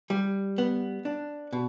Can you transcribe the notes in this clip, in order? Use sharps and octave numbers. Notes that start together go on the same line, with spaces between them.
G3
B3
D4
B2